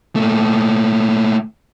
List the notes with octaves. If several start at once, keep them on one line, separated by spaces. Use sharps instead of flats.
A#2 A3